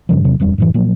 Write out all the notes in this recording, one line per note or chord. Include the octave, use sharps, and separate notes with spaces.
G2 C#3 F3
E2 C3 F#3
D#1 F2 G3 D4
F#2 A2 E3
A#2 F3 F#3 A#3